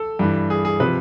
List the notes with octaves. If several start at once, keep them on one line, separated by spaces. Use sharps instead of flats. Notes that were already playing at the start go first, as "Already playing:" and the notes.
Already playing: A4
G2 E3
G#4
G#4
C3 F3 B4